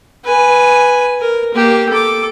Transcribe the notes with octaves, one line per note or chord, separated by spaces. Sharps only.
B4 G#5
A#4
A#3 G4
A4 D6